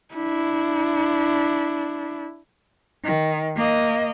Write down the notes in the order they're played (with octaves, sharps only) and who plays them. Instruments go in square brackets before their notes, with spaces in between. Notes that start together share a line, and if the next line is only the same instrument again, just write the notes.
[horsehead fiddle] D4 E4
[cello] D#3
A#3 D#5